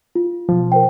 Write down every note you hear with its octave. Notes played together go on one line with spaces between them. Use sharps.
F4
B2 F3
A#4 C5 G5